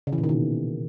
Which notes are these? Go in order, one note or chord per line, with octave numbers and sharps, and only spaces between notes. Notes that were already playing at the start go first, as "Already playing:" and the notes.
C#3
E3
A#2
D#3
B2